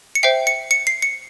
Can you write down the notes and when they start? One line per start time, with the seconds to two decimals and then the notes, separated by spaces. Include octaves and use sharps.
0.15 C#7
0.23 C5 E5 G5 C7
0.47 C#7
0.71 C#7
0.87 C7
1.02 C#7